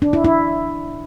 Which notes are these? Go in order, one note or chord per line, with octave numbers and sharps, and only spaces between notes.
D4
E4
E4